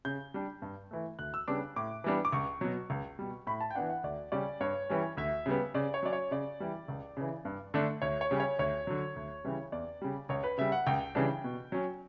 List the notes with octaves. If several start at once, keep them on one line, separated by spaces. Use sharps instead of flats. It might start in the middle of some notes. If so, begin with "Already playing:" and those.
C#3 G6
G3 D4
G2
E3 A3
D2 F#6
E6
C#3 G3 B3 D4 D6
A2 D6
E3 G3 B3 D4
D6
C#2 C#6
B2 F#3
C#2
B2 G3
A2 B5
A5
G5
E3 B3 D4 F#5
F#5
D2 D5
C#3 G3 C#4 D5
G2 C#5
E3 G3 C#4
D2 E5
C#3 G3 B3
C#3 D5
C#5
F#3 C#4 D5
C#5
C#3 D5
E3 G3
C#2
C#3 E3
G2
D3 A3 D4
D2 C#5
C#5
C#3 G3 C#4
C#5
D2 C#5
D3 F#3
D2
C#3 E3 G3
E2 D5
C#3 G3
C#2 C#5
B4
C#3 G3 E5
F#5
C#2 G5
C#3 E3 G3 D4
B2
F#3 C#4